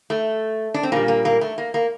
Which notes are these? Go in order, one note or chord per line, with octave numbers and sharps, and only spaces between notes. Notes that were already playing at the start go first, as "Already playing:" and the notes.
A3
D4
C4
A#2 G3 A#3
A#3
A#3
A3
A#3
A#3